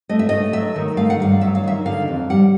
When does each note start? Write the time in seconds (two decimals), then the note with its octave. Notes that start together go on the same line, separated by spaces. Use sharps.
0.09 A3 D#5
0.19 E5
0.29 A3 D#5
0.53 F#3 E5
0.76 D#3
0.97 A3 F5
1.10 F#5
1.20 G2 F5
1.41 F#3 E5
1.55 F5
1.64 D#3 E5
1.85 D3 F5
2.08 F2
2.30 G3 F#5